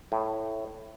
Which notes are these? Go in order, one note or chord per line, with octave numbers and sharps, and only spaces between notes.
A2